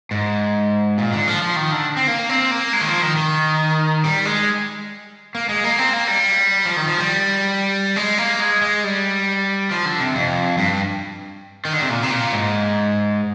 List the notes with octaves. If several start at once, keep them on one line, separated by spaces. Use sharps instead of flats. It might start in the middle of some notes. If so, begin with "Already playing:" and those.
G#2
A#2
D3
F3
F3
D#3
D3
C4
A#3
C4
A#3
G#3
D#3
F3
D#3
D#3
G3
G#3
A#3
G#3
A#3
C4
A#3
G3
F3
D#3
F3
G3
G#3
A#3
G#3
G#3
G3
F3
D3
C3
F2
G2
D#3
D3
C3
A#2
C3
A#2
G#2